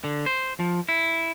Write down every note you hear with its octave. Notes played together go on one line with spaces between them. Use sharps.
D3
C5
F3
E4